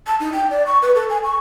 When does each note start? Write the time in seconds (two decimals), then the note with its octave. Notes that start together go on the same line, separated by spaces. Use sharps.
0.07 A5
0.20 D#4
0.33 G5
0.50 D5
0.66 C#6
0.82 B4
0.95 A4
1.09 G#5
1.24 C#6